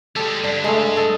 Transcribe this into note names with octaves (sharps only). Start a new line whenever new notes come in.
G3 G#3 G4 A4
G2 D3
G#3 A3
A4 D#5